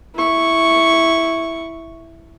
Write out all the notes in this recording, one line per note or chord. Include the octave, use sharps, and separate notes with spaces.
E4 C#6